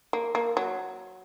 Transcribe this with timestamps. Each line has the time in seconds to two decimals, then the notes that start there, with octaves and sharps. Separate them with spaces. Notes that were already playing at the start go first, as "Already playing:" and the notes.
0.13 A#3
0.35 A#3
0.57 F#3